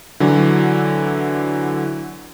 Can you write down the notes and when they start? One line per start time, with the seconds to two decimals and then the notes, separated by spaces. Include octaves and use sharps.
0.20 D3 E3 F#3